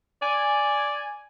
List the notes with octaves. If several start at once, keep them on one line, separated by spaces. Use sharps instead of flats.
D5 G#5